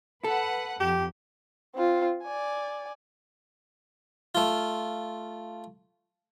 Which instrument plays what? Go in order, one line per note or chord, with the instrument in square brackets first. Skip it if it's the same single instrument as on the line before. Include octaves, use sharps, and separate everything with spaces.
[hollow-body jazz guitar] A4 [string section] B4 F#5
[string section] F2 [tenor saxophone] G4
[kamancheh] C4 F4
D5 G#5
[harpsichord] A3 F4